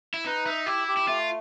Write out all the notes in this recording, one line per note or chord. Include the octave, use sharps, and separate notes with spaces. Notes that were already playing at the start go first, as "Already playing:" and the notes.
E4
D#4 B4
D#4 E5
E4 G4
G4
E4
A3 F4